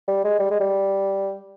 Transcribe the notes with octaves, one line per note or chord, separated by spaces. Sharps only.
G3
G#3
G3
G#3
G3